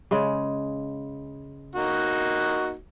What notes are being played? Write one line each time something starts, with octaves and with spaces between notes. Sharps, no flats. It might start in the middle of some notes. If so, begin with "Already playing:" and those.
C#3 G#3
A#3 D#4 F#4